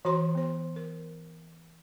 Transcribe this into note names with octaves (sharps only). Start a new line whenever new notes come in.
E3 F#4 C5 A#5 C6
B3 C5
A#4